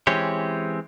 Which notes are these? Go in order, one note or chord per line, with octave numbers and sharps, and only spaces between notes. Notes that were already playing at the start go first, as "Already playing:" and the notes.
E3 G#3 C4 C#4 G4 C#5